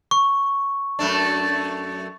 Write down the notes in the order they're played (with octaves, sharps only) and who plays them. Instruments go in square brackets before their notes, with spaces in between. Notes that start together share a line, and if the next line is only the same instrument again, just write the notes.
[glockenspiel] C#6
[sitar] F#2 A3 D4